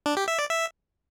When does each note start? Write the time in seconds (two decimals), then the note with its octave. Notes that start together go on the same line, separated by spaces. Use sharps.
0.06 D4
0.17 G4
0.28 E5
0.39 D5
0.50 E5